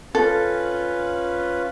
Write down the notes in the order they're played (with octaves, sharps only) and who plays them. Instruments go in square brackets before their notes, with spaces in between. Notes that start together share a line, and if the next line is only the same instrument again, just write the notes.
[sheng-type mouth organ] C#4 F4 B4 [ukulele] A4